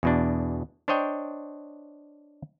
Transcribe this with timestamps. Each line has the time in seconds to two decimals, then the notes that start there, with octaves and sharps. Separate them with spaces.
0.03 E2 B2 D4
0.88 D4 C5 C#5 D#5 G5